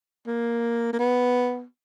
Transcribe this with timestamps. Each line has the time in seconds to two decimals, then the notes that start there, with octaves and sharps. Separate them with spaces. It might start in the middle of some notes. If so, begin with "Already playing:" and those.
0.27 A#3
0.93 A#3
0.99 B3